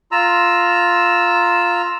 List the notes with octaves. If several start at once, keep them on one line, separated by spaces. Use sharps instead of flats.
F4 A#5 E6